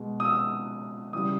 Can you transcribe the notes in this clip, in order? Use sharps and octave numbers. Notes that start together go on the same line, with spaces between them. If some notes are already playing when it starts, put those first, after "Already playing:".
Already playing: B2 G#3
D#6
E6
C#3 E3 G3 D#6